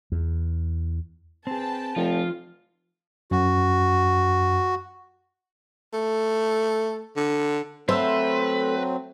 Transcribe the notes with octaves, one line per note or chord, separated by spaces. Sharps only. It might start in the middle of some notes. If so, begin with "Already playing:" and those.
E2
C4 G#4 B4 G5 A5
F1 F3 F4
F#2 F#4
A3
D3
F#3 A3 C4 B4 C5 E6